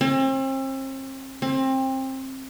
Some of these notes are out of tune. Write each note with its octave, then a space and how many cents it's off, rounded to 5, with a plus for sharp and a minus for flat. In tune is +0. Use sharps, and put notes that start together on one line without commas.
C4 +40
C4 +25